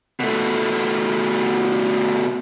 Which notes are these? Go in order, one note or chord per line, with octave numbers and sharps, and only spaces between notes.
B2 A3